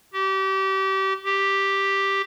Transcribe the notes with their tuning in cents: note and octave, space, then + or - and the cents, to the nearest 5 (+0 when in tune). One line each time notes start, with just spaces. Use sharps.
G4 -30
G4 +0